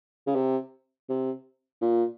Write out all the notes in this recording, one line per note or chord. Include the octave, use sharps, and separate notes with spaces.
C#3
C3
C3
A#2